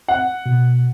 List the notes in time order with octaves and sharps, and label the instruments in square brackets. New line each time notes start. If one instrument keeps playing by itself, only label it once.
[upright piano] F#5
[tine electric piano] B2